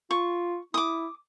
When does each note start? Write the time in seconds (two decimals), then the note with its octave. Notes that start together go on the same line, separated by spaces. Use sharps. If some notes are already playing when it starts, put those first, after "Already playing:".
0.11 F4 C#6
0.74 E4 D6 D#6